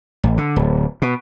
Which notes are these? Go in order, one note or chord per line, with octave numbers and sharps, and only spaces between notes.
A1
D3
D1
B2